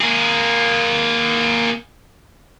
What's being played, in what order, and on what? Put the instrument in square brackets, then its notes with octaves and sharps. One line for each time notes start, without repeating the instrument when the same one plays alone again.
[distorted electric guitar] A#3 G#4